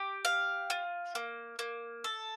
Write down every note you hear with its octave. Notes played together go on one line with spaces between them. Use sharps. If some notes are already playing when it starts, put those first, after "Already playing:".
Already playing: G4
F5
F4
A#3
A#3
A4